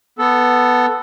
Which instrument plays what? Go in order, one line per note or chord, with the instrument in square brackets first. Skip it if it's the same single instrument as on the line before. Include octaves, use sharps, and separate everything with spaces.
[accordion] B3 A4